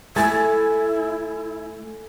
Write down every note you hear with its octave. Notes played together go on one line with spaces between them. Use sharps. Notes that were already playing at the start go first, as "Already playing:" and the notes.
A3 E4 G#5 G#6 A6